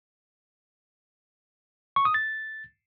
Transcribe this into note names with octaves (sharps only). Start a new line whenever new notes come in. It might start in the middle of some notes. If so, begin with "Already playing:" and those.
C#6
D#6
A6